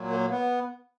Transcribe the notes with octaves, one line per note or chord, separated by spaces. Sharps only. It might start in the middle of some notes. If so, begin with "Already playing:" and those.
Already playing: A#2 F#3
A#3
B3